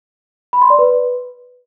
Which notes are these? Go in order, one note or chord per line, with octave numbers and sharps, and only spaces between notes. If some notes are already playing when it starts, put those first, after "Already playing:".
B5
C6
D5
B4